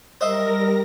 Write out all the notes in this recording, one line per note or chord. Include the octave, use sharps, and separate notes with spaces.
G3 A#4 C5 D#5 E5 A#6